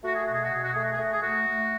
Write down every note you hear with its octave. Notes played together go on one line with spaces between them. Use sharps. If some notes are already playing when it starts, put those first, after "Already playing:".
A3 F#4
G#4
B2 F#4
G#4
F#4
B2 G#4
F#4
A3 G#4
F#4
G#4
A3 F#4
G#4
A3 F#4
A3